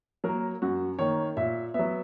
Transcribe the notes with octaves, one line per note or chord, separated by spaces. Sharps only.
F#3 A#3 A#4
F#2 F#4
D#3 A#3 C#5
A#2 E5
F#3 B3 E5